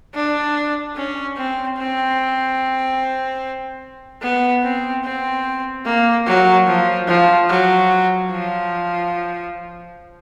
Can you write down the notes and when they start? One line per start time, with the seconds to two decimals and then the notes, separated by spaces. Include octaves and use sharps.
0.14 D4
0.96 C#4
1.37 C4
1.78 C4
4.22 B3
4.63 C4
5.04 C4
5.85 A#3
6.26 F#3
6.67 F3
7.07 F3
7.48 F#3
8.30 F3